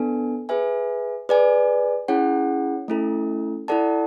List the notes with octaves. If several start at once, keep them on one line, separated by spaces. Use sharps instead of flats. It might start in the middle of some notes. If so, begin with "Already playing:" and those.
Already playing: B3 D4 A4 G#5
G#4 B4 E5 G#5
G#4 B4 D5 G#5
C#4 E4 G#4 C#5 F#5
A3 C#4 E4 A4
E4 A4 D5 F#5 A5